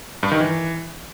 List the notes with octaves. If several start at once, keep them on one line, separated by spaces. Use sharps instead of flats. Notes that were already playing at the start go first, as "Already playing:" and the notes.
G2
D#3
E3